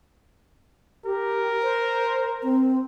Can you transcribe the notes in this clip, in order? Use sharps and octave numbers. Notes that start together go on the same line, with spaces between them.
G4 A#4
C5
C4